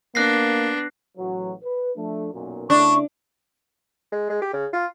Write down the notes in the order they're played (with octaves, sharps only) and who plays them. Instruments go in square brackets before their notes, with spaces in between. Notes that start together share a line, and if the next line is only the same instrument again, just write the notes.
[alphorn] A#3 [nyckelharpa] B3 D4 [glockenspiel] F#6 A#6 C7
[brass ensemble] A1 F#3
B4
F3 A3 D4
B1 F#2 A#2
[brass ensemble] C#3 A3 E4 [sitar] D4 [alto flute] C#6
[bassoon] G#3
G#3
G4
C#3
F4